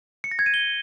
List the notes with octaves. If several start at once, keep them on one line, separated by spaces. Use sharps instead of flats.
C#7
A#6
G#6
D#7
G7